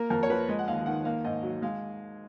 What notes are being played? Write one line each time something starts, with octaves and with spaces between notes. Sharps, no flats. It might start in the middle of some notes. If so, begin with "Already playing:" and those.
Already playing: A#3 A#4
F2 A#4
C#5
F3 B4
G#3 D#5
F#5
D#2 F5
D#3 F#5
A#3 F5
G#2 D#5
F#3
G#3 F5